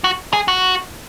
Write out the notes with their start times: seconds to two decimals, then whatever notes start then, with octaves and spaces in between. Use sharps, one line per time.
0.04 F#4
0.33 G#4
0.48 F#4